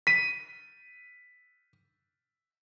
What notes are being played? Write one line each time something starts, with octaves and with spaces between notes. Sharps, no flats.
B6 D#7